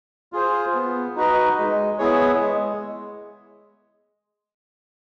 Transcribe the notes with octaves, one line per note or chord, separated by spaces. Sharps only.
F4 G#4 C5
B3
D#4 F#4 B4 D#5
G#3
B3 E4 G#4 C#5
G#3